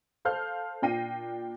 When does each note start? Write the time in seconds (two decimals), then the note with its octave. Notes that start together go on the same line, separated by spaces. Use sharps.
0.25 A4 C5 F5 A5 F6 G6
0.82 A#2 D4 G5 A#6 C7 D#7